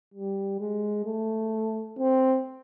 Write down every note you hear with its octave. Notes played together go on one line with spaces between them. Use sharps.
G3
G#3
A3
C4